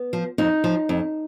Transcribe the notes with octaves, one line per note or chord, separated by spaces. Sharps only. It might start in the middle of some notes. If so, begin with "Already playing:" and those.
Already playing: B3
F3
F2 D#4
F3
F2